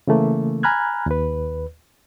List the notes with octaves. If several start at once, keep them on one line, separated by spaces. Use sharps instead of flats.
C#3 E3 A3 A#3
G#5 A#5 B5 F6 F#6 G#6
D#2 B4